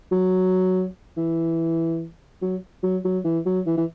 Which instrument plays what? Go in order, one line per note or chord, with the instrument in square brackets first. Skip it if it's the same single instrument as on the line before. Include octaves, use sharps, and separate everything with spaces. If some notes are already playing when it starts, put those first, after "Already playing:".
[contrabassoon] F#3
E3
F#3
F#3
F#3
E3
F#3
E3
E3